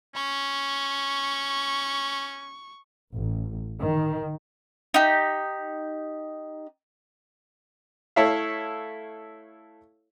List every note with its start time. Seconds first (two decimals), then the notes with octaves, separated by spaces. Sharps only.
0.15 C#4 C#6
3.14 A1
3.80 D#3
4.94 D#4 G4
8.16 A3 E4 A4 C#5 E5 F5